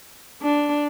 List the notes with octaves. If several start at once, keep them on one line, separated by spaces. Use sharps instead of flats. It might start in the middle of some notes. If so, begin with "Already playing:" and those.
D4